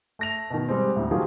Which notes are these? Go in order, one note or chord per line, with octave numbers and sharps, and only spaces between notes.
A3 A#6 F7
B2 D#3
G3 G#3 C4
D2 A2
D#3 F3 F#3 F4 G4 G#4